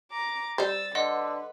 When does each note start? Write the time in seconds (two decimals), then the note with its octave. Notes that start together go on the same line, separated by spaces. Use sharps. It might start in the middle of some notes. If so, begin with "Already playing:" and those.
0.11 A#5 D6
0.58 G3 C5 E6 A6
0.95 D3 B4 D#5 F#5 C6